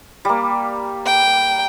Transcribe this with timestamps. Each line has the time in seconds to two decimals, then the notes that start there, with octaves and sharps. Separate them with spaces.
0.25 G3 A#3
1.06 G5